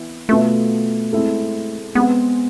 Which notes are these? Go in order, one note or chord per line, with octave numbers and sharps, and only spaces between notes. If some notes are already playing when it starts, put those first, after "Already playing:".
Already playing: E3 B3 E4
B2 A3 B3 F4 A4
G#3 C4 E4 A4
G#3 B3 C4 G#4